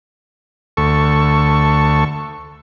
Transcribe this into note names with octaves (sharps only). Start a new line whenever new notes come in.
D2 A4 C#6